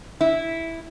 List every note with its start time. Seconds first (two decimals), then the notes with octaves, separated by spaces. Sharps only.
0.21 E4